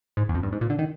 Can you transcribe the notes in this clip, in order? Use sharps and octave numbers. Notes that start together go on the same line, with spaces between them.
G#2
E2
F2
G2
G#2
A#2
D3
D#3